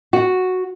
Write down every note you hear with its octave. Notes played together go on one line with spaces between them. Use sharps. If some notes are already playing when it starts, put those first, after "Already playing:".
F#4